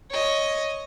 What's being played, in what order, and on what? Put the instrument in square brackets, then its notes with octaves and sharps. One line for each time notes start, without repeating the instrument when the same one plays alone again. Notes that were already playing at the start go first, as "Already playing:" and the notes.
[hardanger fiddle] C#5 D#5